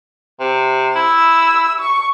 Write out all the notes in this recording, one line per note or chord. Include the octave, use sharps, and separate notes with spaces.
C3
E4 E6
C#6